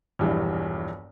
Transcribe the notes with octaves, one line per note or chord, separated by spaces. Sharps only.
E1 A#1 G2 E3